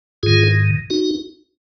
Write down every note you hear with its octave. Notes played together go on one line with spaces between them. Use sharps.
G#2 D#3 F4 G#4
D#4 F#4